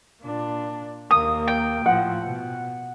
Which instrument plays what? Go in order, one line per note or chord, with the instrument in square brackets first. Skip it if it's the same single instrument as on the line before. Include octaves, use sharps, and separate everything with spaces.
[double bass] A#2 D4
[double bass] D#2 A#3 [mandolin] D#6
[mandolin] G5
[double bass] A2 F3 [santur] F#5
[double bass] B2